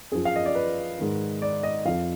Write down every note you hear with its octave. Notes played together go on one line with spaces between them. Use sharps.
F#2 F3 G#4
F5
D#5
D5
B4
G#2 D#3
D5
D#5
F2 F3 F5